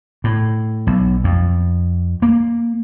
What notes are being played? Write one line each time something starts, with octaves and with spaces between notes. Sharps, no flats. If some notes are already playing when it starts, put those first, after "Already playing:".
A2
B1
F2
A#3